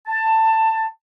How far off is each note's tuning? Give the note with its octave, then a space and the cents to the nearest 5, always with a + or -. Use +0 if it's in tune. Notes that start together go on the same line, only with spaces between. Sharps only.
A5 +15